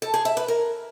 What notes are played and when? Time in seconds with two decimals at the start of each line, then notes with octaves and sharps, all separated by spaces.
0.02 A4
0.14 G#4
0.25 E5
0.37 B4
0.48 A#4